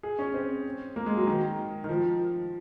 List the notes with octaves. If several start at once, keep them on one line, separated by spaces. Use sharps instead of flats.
G#4
C#4
C4
A#3
G#3
F#3
D#3
D#3
F3